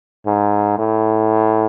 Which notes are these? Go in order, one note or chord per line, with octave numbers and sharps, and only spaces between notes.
G#2
A2